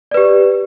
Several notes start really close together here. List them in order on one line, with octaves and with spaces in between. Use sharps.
D5 B4 G4